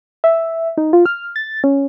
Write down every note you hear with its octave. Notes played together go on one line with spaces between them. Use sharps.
E5
D#4
F4
F6
A6
C#4